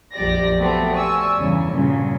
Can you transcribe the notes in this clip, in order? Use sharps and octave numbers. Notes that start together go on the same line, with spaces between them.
A#1 F2 F#3 G4 D5 A#6
A3 B3 C4 F#4 G4 A4
D5 G#5 C#6 E6
E2 G2 C#3
G2 A#2 C#3 F#3